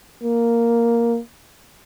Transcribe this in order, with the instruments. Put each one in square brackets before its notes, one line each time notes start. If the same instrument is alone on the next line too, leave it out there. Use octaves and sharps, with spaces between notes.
[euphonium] A#3